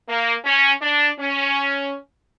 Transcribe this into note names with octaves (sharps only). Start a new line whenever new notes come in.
A#3
C#4
D4
C#4